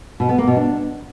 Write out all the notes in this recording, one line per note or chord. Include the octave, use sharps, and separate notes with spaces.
B2
B3
A#3
B2
D4